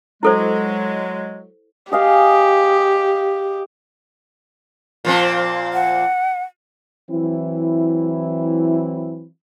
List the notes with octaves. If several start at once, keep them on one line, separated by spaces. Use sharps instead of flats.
F#3 G#3 E4 A4 C5
G4 G#4 D#5 F5
A#2 F3 C4
F#5
E3 F#3 C4 E4